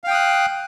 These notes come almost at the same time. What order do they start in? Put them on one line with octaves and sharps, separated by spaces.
F5 G5 D#6 F#6